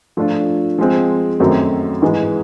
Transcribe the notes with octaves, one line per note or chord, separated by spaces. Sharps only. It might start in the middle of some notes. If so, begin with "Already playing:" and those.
F3 A3 D4 F4
F3 G#3 C4
F#2 D#3 F#3 A3 C4
G#2 E3 G#3